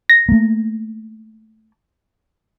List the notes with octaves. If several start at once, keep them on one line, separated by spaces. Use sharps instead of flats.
A#6
A3 A#3